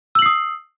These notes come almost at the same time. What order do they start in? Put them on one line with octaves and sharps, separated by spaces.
E6 F#7 C7 D#6